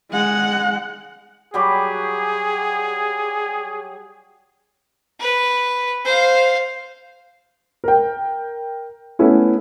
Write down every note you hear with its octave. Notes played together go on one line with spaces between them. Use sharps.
G#3 F#5
F#3 G3 G4 G#4
B4
C5 F5
A#4 G5
A3 B3 C#4 E4